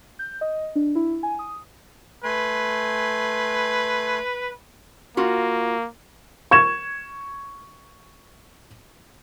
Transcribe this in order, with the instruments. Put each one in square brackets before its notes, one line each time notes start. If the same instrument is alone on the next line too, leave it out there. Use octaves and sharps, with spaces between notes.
[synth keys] G6
D#5
D4
E4
G#5
D#6
[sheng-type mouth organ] A3 G#5 C6 [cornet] B4
[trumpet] A#3 [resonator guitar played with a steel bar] F4 F#4
[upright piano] C#6 G#6 E7